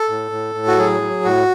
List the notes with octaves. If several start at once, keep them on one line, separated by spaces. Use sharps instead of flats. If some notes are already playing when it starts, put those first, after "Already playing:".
Already playing: A4
A2
A2
A2
F#4
F#3 G#4
F#3
A2 F#4